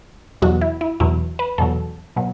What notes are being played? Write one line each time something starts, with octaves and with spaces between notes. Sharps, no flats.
E2 B2 F#3 F#4
E4
E4
E2 B2 F#3 E4
B4
E2 B2 F#3 A4
B2 F#3